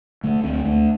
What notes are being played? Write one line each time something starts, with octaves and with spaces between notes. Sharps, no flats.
D3 A3
D2 C4
D2 A3